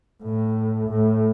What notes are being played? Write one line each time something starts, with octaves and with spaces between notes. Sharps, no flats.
A2
A2